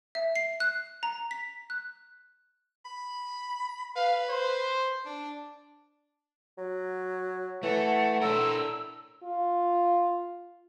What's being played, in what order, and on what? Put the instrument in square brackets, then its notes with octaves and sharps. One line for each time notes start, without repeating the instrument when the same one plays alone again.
[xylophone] E5
C7
F#6
A#5
B6
F#6
[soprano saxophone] B5
[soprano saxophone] B4 [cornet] F5
[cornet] C5
[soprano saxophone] D4
[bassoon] F#3
[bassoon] E3 [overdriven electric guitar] A3 [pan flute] F#5
[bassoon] A2 [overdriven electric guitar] D4 A#4 [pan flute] E6
[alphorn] F4